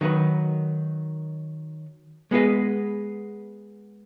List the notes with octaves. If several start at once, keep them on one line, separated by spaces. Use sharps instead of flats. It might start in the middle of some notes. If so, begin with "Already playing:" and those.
D#3 F#3 D#4 B4
G#3 B3 G#4 B4 D#5